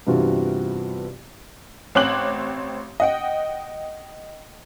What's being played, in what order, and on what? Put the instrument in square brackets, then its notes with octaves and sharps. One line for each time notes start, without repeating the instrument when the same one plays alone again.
[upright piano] G2 C3 E3 B3 F4 F#4
[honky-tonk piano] A1 C4 C#5 D6 F#6 F#7
D#5 F#5 G5